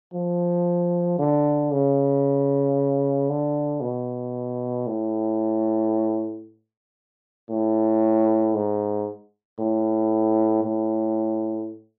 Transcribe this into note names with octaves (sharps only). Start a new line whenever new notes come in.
F3
D3
C#3
D3
B2
A2
A2
G#2
A2
A2